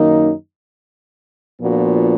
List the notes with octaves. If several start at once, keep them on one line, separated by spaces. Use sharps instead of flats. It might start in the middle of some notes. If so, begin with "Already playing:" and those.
Already playing: F#2 D#3 A#3 D#4
A#2 F3 B3 D4 F#4